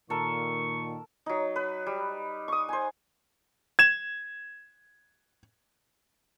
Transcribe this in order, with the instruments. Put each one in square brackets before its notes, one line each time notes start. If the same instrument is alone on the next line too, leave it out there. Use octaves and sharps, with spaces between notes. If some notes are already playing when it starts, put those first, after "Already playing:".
[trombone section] A#2 D#3 [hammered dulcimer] A4 A#4 [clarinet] C#6
[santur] F#3 D#4
B4
G3
C#6 D#6
C5 G#5
[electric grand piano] G#6 E7